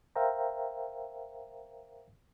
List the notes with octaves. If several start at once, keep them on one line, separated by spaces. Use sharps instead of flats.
A#4 C5 E5 F5 G5 A#5